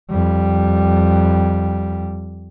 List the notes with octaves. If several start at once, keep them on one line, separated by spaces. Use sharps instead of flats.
F2 G3